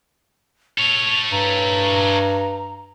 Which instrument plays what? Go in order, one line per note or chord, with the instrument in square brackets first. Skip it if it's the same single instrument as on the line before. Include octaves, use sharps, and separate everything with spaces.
[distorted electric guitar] A4 C#5 [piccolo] F7
[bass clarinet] G2 [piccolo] A#5